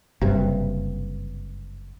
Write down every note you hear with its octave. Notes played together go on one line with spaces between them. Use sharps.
F#1 G2 C3